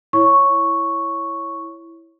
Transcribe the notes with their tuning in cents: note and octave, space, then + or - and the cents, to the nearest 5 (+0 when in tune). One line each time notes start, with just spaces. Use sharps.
E4 +5 C#5 +0 C#6 +0